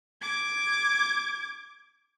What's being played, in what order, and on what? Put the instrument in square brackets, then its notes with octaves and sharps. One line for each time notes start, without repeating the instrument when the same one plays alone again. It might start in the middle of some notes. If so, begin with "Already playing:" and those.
[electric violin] D6 G#6